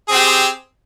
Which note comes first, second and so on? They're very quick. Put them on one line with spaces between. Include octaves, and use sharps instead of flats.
G#4 C4 G4